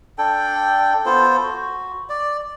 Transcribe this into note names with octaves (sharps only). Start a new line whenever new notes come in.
D4 A4 G5
B3 F4 A4 C5
F#4
D5